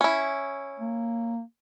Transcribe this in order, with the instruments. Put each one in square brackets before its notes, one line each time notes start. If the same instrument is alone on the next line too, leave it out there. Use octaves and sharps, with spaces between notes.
[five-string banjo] C#4 E4
[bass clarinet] A#3